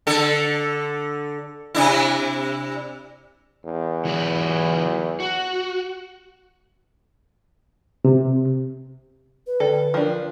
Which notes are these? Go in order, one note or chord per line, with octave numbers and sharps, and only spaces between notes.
D3 A4
C3 D4 E4
E2
E3 F#3 B4
F#4
C3
B4
D3 A4 D5 G5
F3 D4 A#4 G5